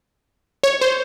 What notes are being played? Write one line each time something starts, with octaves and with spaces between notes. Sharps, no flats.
C#5
C5